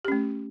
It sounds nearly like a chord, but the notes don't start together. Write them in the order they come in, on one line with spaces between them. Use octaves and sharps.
G4 C#4 A3